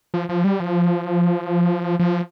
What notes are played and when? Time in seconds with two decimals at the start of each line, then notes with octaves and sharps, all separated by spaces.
0.14 F3
0.29 F3
0.44 G3
0.60 F3
1.99 F3